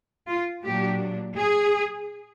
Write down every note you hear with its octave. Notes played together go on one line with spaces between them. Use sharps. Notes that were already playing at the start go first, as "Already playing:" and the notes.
F4
A#2 F#3 A#3 D4 G4
G#4